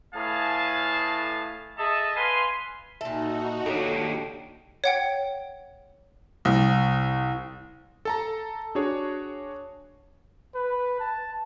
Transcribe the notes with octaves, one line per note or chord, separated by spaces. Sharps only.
A2 G#4 B4 F5 A5
G#4 A4 D#5 E5 A5
B4 F5 G#5 C6
A#2 D#4 F#4 A4 E5
D#2 D4 G4 A4 C#5
C#5 F#5 G5
C2
A4 A5 A#5
D4 F#4 G#4 C#5
B4
A5